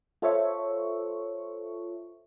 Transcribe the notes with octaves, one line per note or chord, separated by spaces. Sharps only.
F4 A4 C5 C#5 E5 C#6